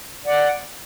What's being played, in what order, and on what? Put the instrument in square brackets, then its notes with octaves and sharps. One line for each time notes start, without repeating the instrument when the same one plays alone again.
[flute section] D5 F#5